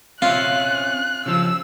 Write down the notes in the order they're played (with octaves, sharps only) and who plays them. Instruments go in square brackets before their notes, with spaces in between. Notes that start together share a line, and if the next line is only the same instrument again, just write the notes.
[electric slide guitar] C4 C#4 E5 [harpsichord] F4 [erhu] F#6
[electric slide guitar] C#3 F3 [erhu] E6